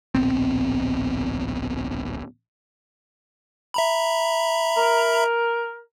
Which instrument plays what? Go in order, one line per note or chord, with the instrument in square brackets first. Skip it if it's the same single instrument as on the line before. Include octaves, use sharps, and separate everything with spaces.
[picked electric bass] D1 A#1 B3 C4
[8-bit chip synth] E5 A#5 B5
[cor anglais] A#4